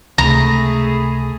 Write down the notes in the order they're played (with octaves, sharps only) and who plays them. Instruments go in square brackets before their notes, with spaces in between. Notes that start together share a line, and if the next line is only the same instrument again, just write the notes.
[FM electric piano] C#2 C3 B5 [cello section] A3 G#4 [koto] A#5